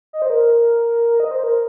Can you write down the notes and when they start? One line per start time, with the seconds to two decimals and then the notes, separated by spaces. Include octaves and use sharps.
0.13 D#5
0.22 C5
0.30 A#4
1.20 D#5
1.31 C5
1.44 A#4